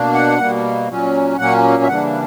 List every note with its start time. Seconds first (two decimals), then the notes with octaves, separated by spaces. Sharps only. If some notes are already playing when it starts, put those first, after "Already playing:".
Already playing: B2 A#3 D4
0.14 F#5
0.39 B2 G3 A#3
0.89 A#2 F#3 C#4
1.38 A#2 F#3 A#3 C#4 F#5
1.83 E5
1.88 C#3 E3 G3 A#3 D4 F#5